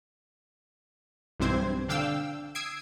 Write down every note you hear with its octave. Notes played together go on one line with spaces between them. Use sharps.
B1 G2 E3 C4 C5 G#6
D3 D4 F5 G5 E6
D#6 E6 G#6 C7 D7